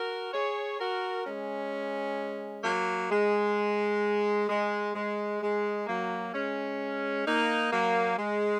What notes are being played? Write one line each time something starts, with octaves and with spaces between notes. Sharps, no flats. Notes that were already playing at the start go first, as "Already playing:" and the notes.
Already playing: F#4 A#4
G#4 C#5
F#4 A#4
G#3 C#4
F#3 A#3
G#3
G#3
G#3
G#3
F#3 A#3
G#3 C#4
A#3 D#4
F#3 A#3
G#3